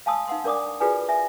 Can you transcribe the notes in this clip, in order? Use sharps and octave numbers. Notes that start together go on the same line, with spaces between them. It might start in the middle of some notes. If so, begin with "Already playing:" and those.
F5 G#5 A5 C6 D#6 E6
D#4 F5 F#5 C6
D4 A#4 D5 D6 D#6
F4 F#4 G#4 B4 D5 G#5
E5 G#5